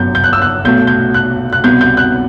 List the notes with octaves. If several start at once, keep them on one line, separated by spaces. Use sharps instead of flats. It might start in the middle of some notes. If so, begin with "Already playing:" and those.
Already playing: G1 F#2 F#3 B3 G6
G6
F#6
E6
F#6
B1 B2 A3 G6
G6
F#6
F#6
C2 B2 G3 B3 G6
G6
F#6